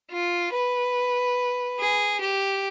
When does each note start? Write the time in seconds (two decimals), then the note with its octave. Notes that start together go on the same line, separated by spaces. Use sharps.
0.11 F4
0.53 B4
1.79 G#4
2.21 G4